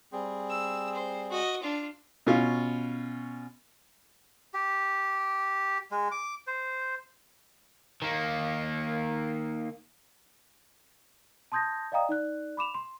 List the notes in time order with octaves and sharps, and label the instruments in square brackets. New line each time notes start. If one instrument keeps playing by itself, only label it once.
[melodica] G3 C4 G#4
[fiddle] E6
C5
F#4 D#5
D4 F4
[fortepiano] B2 C#4 F4
[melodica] G4
G#3
D6
C5
[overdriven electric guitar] D#3 A#3
[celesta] A5 C6 D#6 G6 G#6 A#6
D5 D#5 F5 G5 A#5 D#6
D#4 D5 F#6
B5 D6 E7 F7
C6